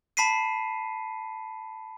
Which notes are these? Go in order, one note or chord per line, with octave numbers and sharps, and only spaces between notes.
A5 B5 B6 C7 D#7